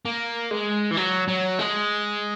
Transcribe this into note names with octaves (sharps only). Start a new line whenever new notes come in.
A#3
G#3
E3
F#3
F#3
G#3